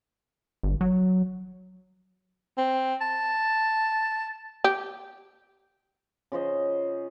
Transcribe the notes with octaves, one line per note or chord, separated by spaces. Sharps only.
G1
F#3
C4
A5
G4
C#3 F4 C5 D#5